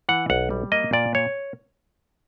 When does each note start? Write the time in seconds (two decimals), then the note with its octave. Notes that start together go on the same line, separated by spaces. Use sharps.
0.09 E3 F#5
0.30 B1 F#5
0.50 G3
0.72 A#3 D#5
0.93 A#2 D5
1.15 C#5